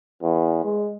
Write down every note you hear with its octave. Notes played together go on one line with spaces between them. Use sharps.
E2
G#3